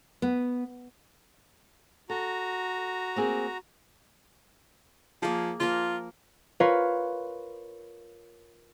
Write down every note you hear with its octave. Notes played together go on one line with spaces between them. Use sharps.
B3
F#4 A4 A#5
A#3 C4 G#4
F3 A#3 G#4
F3 A#3 F4 A#4
F4 A#4 B4 C#5 F5